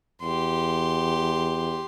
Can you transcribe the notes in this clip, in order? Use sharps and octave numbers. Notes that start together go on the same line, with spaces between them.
E2 G4 C6